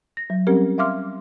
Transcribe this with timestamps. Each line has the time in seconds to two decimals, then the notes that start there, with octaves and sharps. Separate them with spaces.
0.17 A#6
0.30 F#3
0.47 G3 C4 C#4 G4 A#4
0.78 E5 F5 C6 D6 F6